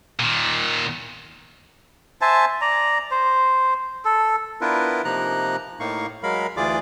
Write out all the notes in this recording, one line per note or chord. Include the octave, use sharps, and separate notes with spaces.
A#2 D#3
C5 E5 G#5 A5
D5 A#5
C5
A4
B3 D4 E4 F4 A#4 B4
C3 F3 A#3 D#4 A#5 F#6
A2 A#3 D#4 F5 C#6
F#3 G#3 A#4 F5 B5
D2 E3 F4 G#4 D5 D6